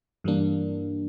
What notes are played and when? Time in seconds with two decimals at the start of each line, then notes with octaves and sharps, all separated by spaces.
0.24 G2 E3 G3 A#3 D4